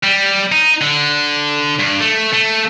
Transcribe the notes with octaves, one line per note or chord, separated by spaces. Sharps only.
G3
D#4
D3
G2
A3
A3